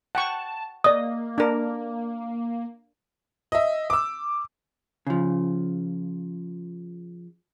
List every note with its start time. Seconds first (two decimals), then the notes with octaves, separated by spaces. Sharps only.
0.15 F#5 G5 A5 C#6
0.84 A#3 D5 D#5 D#6
1.38 D4 A#4
3.52 D#5 E5
3.90 D6 E6
5.07 C#3 F3